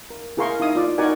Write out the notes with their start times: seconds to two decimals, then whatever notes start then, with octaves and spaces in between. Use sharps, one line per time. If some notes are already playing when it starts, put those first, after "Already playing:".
0.10 A#4
0.37 E4 G#4 A#4 F5 C6 C#6
0.60 D#4 E4 F5 D#6
0.76 F4 D5
0.98 D#4 F#4 A#4 D5 F#5 G#5